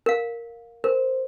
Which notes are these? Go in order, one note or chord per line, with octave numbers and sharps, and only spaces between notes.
A#4 F5
A#4 C5